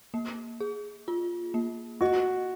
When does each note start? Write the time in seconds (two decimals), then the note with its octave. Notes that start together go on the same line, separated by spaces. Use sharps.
0.14 A#3
0.60 G#4
1.08 F4
1.54 A#3
2.01 F#4 D#5